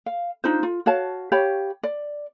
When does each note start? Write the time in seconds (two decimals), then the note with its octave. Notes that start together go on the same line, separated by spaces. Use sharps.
0.06 F5
0.44 D4 D#4 F4 C5
0.63 F4
0.86 F#4 C#5 F5 A5
1.32 G4 C#5 F5 B5
1.83 D5